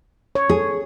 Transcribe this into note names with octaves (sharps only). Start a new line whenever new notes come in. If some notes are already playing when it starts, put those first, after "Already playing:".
C#5
G#4